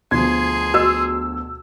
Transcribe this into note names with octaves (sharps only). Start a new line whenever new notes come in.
D2 B2 F3 G#4 C6 G#6
F#4 D#5 E6